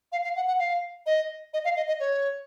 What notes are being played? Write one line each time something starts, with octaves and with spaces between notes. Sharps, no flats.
F5
F5
F#5
F#5
F5
D#5
D#5
F5
D#5
D#5
C#5